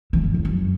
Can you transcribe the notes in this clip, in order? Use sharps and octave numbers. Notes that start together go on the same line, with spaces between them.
E3
G2
E2
F#2